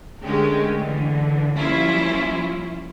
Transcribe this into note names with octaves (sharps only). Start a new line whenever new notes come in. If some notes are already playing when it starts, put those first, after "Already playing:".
D3 G#3 A3 C#4 G4 A#4
D3 E3
F3 G3 A#3 C#4 E4 F4